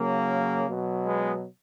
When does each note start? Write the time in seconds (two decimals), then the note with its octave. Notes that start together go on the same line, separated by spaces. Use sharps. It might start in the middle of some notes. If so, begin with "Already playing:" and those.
Already playing: C#3 F#3 A#3
0.67 B2 F#3
1.05 G#3 B3